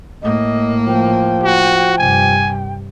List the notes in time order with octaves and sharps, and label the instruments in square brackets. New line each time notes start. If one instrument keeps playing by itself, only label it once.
[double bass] A2 A#3 [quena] D#5
[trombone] F3 [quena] G5
[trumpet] F#4
[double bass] G2 C3 [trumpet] G#5